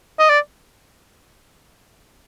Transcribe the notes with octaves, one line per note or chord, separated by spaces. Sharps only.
D#5
D5